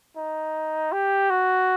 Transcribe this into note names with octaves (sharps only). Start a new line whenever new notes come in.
D#4
G4
F#4